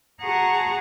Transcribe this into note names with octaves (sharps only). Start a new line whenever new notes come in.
F#4 G#4 F#5 A5 A#5 C#6